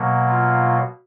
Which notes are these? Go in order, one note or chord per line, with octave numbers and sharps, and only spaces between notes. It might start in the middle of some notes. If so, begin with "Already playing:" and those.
Already playing: B2 F#3 A#3
F4